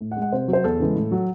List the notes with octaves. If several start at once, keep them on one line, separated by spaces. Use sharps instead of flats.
A2
F#5
G#3
F#5
C3 C5
F#3
C5
E2 A4
C#3 E3 G#3
A2
F#3